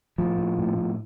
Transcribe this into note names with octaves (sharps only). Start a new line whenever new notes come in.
A2 F3
A2
A2
A2